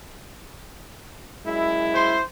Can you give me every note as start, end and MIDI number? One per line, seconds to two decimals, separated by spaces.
1.45 2.18 42
1.45 2.18 56
1.45 2.18 64
1.95 2.23 72
1.95 2.23 84